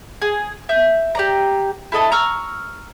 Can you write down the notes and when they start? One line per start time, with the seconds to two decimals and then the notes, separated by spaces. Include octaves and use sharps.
0.22 G#4
0.69 E5 G6
1.15 G4 D5 A#5
1.92 E4 A4 D#5 A5
2.12 A#5 C#6 E6 F6